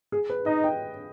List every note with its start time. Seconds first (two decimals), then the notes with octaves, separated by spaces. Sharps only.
0.12 G#4
0.30 B4
0.46 D#4 D#5
0.64 G5